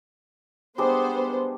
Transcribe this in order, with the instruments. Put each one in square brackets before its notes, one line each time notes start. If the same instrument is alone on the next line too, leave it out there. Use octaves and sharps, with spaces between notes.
[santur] G3 G#3 D4 [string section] B3 C5